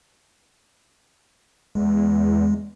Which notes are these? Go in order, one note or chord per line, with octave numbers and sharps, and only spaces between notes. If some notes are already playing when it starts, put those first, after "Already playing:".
E2 G#3